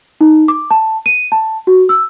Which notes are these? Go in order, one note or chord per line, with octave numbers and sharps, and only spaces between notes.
D#4
D6
A5
D#7
A5
F#4
E6